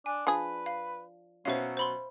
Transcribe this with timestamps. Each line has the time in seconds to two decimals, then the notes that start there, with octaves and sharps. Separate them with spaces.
0.06 D4 G#5
0.27 F3 D4 G#4 B4
0.66 F5
1.45 B2 F#3 C#4 C5 E5 F5
1.77 C5 B5 C6